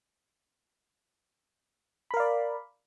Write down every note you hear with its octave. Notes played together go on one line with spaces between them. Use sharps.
A#4 D5 F5 B5